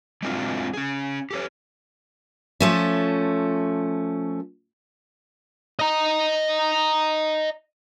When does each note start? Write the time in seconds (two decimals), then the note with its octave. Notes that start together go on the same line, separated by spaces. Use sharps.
0.23 G#3 A3 C4 D4 F4 F#4
0.74 C#4 G#4
1.31 G4 A4 C#5
2.60 F3 A3 C#4
5.79 D#5 A#5